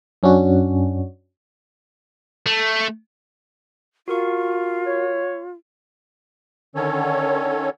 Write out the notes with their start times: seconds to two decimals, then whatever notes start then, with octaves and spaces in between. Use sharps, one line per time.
0.23 F#2 C#4 D4 F#4
2.46 A3
4.08 F4 F#4 A#4 C#6
4.85 C#5
6.75 D3 D#3 C#4 A4 C#5